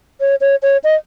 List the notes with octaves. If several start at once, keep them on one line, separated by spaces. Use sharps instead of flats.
C#5
C#5
C#5
D#5